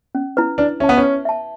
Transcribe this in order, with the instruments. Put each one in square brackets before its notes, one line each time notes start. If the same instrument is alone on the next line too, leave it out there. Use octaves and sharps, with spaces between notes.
[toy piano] C#4
E4 B4
[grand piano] D4 [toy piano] B4
[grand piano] C#4 [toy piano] E5
[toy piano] A5
[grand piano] B3
C#4
[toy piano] B4
E5 A5